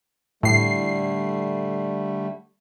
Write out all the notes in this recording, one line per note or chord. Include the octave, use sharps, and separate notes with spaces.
A2 D3 G3 A3 C7